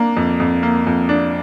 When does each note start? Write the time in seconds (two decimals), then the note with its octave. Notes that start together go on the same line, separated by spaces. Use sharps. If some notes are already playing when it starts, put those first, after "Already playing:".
Already playing: A#3 D4
0.17 F2
0.40 F2
0.63 A#3
0.87 F2
1.09 D4